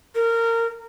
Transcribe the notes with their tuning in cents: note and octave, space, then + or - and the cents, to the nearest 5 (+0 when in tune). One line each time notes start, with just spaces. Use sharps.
A#4 -20